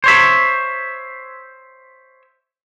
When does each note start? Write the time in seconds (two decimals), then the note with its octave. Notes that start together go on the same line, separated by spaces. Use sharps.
0.04 C5 C#5 E5